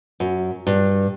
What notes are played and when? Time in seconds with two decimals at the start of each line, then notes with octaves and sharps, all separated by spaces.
0.20 F#2
0.67 G2